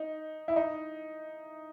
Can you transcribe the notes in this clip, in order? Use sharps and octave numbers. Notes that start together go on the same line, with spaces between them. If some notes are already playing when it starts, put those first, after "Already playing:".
Already playing: D#4
E4
D#4